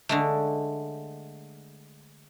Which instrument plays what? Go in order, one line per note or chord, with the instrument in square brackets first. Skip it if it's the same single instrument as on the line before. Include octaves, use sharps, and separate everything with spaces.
[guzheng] D3 G#3 A3